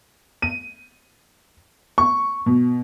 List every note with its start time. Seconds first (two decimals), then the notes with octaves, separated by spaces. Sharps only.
0.42 D#7
1.98 C#6
2.46 B2